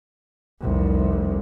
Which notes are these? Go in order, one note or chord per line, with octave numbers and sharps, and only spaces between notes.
F1 C2